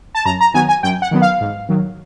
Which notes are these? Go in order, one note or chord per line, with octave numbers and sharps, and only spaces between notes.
A5
F#2 A#5
A#5
D#3 F#3 B3 G#5
G#5
F#2 G5
F#5
D#3 F#3 B3
F5
G#2
D#3 F#3